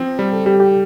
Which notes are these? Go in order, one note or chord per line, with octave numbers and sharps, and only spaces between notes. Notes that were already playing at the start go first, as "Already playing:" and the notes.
Already playing: F3 C4
G3 G4
A4
G3 G4
G4